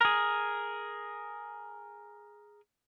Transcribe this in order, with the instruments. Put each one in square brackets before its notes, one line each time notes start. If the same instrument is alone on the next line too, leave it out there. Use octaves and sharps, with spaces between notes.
[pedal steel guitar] G#4 A#4